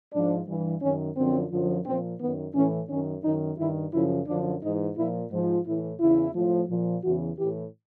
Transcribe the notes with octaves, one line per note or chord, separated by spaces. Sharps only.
G#2 F3 D4
G2 E3
F#2 D#3 C#4
F#2 D3 F3 C4
F#2 D3 F3
A#2 F3 C4
F#2 D#3 B3
A2 E3 C#4
F#2 D#3 C#4
F#2 D#3 D#4
G2 D#3 E4
F#2 C#3 F3 E4
F#2 D3 F3 D4
G#2 E3 D#4
A#2 F3 E4
G#2 F3
A2 E3 E4
E2 C#3 E3 E4
A2 F3
A#2 F3
E2 C#3 E3 F#4
A2 E3 G4